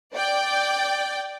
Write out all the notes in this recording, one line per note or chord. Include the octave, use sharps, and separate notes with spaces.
D5 G5